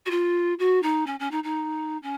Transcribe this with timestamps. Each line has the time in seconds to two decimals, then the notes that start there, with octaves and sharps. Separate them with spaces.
0.05 F#4
0.10 F4
0.59 F#4
0.82 D#4
1.06 C#4
1.19 C#4
1.31 D#4
1.43 D#4
2.02 C#4